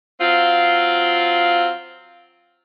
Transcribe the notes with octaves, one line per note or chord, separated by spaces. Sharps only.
F#3 C4 F4